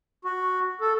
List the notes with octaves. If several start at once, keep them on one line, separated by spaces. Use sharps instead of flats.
F#4
A4